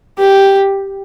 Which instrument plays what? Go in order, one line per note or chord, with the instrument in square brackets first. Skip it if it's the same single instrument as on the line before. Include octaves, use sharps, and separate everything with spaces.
[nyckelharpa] G4